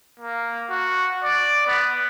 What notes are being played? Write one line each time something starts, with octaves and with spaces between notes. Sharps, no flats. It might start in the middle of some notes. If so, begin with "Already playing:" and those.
A#3
F#4
D5
B3